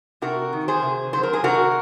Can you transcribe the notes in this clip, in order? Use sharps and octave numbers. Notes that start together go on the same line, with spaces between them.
C3 F#4 A#4
D#3
G#4 C5
C3
F#3 C5
A#4
G#4
C3 F#4 A#4